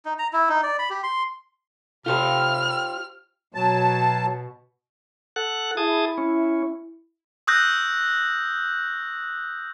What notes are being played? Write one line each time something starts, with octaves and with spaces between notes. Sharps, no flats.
D#4
A#5
E4
D#4
D5
B5
G4
C6
C3 F4 G4 A4 C5 G5 B5 F6
B2 F#3 A5
A4 F#5 F#6
E4 G#4 A5 D#6
C#4
C#6 D#6 E6 F#6 G6 A#6